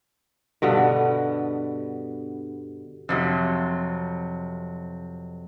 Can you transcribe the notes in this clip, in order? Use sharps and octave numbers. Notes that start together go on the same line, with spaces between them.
G2 B2 D3 B3
F2 C3 F#3